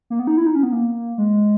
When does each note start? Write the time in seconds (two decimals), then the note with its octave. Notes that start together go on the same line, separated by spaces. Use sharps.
0.10 A#3
0.19 B3
0.27 D#4
0.37 E4
0.46 D#4
0.55 C#4
0.63 B3
0.72 A#3
1.18 G#3